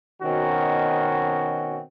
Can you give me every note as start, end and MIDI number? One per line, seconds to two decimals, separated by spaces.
0.23 1.81 47
0.23 1.81 51
0.23 1.81 60
0.23 1.81 61
0.23 1.81 66